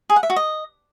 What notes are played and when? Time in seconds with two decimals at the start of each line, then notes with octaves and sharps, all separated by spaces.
0.10 G#4
0.16 F#5
0.23 E5
0.30 F#4
0.36 D#5